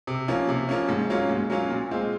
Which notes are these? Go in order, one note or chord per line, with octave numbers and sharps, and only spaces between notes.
C3
F3 A#3 C#4
C3
F3 A#3 C#4
G#2
F#3 A#3 C#4 F4
G#2
F#3 A#3 C#4 F4
A#2
G#3 C4 F4